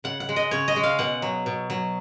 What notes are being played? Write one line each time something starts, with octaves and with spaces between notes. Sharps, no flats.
C#3 F#5
F#5
G#3
D#5
C#3 C#5
D#5
G#3
F5
B2 F#5
F#3
B2
F#3